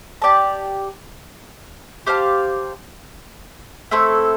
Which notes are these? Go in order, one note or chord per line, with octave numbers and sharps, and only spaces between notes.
G4 D5 A5
G4 C5 F5 A5
A3 C4 E4 A4